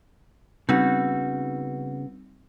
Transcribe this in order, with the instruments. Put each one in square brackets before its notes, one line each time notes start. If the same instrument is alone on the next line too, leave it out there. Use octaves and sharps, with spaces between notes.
[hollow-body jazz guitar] C#3 B3 F#4 [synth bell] G3 C4 D#4